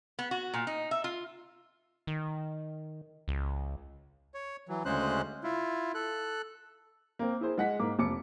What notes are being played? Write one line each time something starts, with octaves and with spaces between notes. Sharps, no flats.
B3
F#4
A#2
D#4
E5
F4
D#3
C#2
C#5
E3 F#3
D2 C#3 G#3 C#4 C5 F#6
E4 F4
A4 F#6
A#3 C4
E4 G#4 C5
G#3 F#5 B6
G#2 A#3 D6
F1 D6 C#7